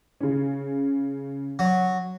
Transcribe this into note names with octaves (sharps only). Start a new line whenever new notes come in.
C#3 C#4
F#3